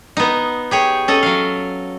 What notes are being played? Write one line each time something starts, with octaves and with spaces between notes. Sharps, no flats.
B3 D#4
G4 G#4 C#5
C#4 A4 D#5
F#3 F5